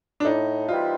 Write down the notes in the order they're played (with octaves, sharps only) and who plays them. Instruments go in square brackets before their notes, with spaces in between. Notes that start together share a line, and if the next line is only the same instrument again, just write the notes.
[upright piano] D4
[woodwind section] A2 [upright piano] D#4
[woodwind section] E3 G3 C4 D#4 [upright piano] F4